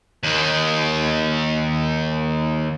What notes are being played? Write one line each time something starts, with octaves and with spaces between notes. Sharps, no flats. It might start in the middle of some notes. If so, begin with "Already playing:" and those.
D#2 D#3